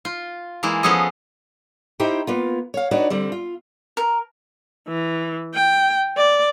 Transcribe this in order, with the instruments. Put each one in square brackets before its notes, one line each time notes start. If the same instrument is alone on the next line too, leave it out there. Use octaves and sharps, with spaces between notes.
[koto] F4
E3 G#3 A#3 E4
F3 B3 C#4 G#4 A4 D#5
[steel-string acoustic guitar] D#4 E4 G4 C5 G5
A#3 B3 F4
C#5 F5
D4 D#4 F#4 B4 C#5 D5
D3 G3 C4
F4
[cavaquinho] A#4
[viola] E3
G5
D5